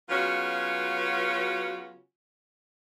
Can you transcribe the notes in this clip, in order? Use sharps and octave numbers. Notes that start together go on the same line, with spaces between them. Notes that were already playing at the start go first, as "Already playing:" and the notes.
C#3 F#3 B3 C#4 F4 F#4